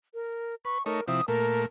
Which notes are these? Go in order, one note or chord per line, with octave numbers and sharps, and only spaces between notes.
A#4
B4 C#6
A3 D#4 A#4 C#5
C3 F3 E4 D#6
A#2 A3 A#4